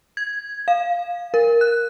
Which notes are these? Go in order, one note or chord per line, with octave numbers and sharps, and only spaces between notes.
G#6
F5
A#4
F#6